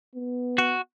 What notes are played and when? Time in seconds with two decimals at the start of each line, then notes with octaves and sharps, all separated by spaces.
0.15 B3
0.58 F#4